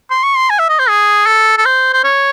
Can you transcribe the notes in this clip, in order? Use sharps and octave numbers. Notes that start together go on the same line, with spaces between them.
C6
C#6
C6
G#5
E5
D#5
C5
G#4
A4
A4
C5
C5
C#5